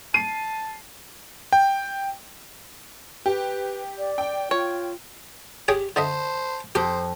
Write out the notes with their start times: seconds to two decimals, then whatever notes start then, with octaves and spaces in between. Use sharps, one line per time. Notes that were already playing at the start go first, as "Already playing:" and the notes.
0.14 A5 C7 D#7
1.52 G5
3.26 G4 B4
3.98 D5
4.18 G5
4.51 F4 C#5
5.68 G4 G#4 C#5 G5
5.96 D3 C5 D#5 E5 A5
6.75 F2 G4 C5 D#6